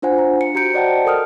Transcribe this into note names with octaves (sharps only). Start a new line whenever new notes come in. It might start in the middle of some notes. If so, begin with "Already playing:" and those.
D4 F4 C5 F#5 G#5
A#5
C#7
F#4 G4 A#5 G6 C#7 D7
C5 D5 D#5 F#5 G5 A5
A4 A#4 D#6 F6